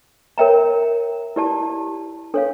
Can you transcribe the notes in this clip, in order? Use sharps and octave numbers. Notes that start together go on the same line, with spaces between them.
A#4 C#5 E5 G5 A#5
E4 G4 D5 A5
D4 A4 C#5 F5